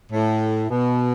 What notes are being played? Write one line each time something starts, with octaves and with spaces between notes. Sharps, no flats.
A2
B2